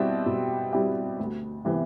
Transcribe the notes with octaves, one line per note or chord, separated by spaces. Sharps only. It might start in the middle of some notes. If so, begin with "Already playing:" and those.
Already playing: B2 G3 C4 E4 G4
B2
G3 C4 E4 G4
D2
C3 E3 B3